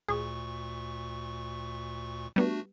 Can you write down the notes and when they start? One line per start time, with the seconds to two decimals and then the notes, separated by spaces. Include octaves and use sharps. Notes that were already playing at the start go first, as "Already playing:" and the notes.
0.08 D2 A#2 G#4 C#6
2.36 G3 A3 B3 D4 F#4